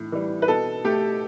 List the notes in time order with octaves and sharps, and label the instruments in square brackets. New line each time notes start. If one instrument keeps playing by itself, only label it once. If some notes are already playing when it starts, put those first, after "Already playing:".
Already playing: [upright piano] A2 E3
E3 G3
B4
B2 A4
A3 G4